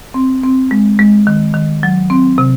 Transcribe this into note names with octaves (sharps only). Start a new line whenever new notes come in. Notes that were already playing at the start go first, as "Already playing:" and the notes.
C4
C4
G#3
G#3
D#3
D#3
F#3
C4
C3